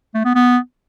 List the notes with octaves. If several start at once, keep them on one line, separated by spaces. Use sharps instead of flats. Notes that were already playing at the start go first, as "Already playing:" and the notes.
A3
B3
B3